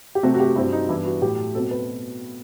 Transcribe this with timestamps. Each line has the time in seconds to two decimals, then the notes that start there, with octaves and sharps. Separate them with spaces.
0.15 G4
0.23 C3 F#3 A3 C4 F#4
0.34 F#4
0.40 G4
0.45 F#4
0.56 G2 F#3 C4 E4
0.73 D#4
0.89 G2 E3 B3 E4
1.05 F#4
1.22 A2 F#3 A3 G4
1.55 B2 F#3 C4 A4
1.71 B4